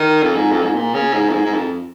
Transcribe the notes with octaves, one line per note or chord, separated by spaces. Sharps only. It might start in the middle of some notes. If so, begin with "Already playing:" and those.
Already playing: D#3
F2
G#2
F2
G#2
A#2
C#3
G#2
F2
G#2
G#2
F2